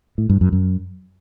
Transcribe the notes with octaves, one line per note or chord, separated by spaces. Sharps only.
A2
G2
F#2
F#2